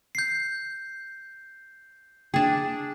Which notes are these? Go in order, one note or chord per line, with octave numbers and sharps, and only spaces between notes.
G6 C7
D4 G#4 G5